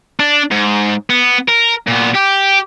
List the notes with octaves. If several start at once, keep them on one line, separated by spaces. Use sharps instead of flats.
D4
G#2
B3
A#4
A#2 B3
G4